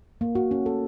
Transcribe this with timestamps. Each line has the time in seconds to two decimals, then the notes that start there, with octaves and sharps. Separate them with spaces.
0.21 A#3
0.35 F#4
0.51 C#4
0.66 A4